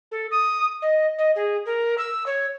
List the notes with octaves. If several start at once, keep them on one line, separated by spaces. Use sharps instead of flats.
A4
D#6
D#5
D#5
G#4
A#4
E6
C#5